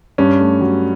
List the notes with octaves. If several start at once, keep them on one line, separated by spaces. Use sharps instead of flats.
G2 C#4
A3
F#3